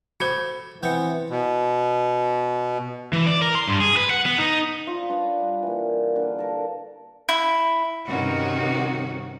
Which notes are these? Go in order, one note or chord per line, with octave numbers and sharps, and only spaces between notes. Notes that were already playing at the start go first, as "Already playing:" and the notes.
F#4 A4 C5 B5 G#6
E3 B3 C4 G6 C#7
B2
E3
D5
A#4
C6
G2
G#4
B4
F#5
B3
D#4
F4 C5 D5 A#5
D4 B4 C#5 B5
G3
E3 A#3
D3 A#3 B4 F5
A4 A#4 D5
E4
G2 C3 D#3 C#4 F#4